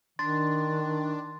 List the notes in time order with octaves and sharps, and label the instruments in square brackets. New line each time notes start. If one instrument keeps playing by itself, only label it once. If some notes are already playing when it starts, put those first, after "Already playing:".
[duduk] D#3 [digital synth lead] D4 [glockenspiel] C6 A6